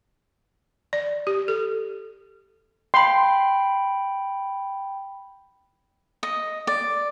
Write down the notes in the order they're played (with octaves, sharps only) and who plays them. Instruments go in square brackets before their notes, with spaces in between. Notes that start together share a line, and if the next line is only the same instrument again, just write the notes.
[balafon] D5
G4
A4
[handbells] G5 B5 [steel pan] C6
[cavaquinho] D#5
D5